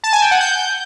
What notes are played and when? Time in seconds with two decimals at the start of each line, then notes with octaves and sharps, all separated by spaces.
0.04 A5
0.13 G#5
0.22 G5
0.31 F#5
0.41 G6